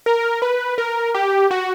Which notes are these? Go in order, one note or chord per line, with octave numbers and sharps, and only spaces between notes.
A#4
B4
A#4
G4
F#4